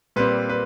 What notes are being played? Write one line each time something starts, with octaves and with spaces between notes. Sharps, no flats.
A#2 G3 C4 B4
B4